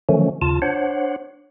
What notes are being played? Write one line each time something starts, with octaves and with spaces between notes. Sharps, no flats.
D3 D#3 F3 F#3 A3 C#4
D#2 C#3 F4 A5
D4 C5 C#5 F#5